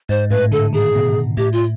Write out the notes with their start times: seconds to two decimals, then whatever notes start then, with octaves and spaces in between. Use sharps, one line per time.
0.09 G#2 C5
0.30 A2 B4
0.51 D3 A4
0.73 D#3 G#4
0.95 B2
1.37 A2 G4
1.53 F4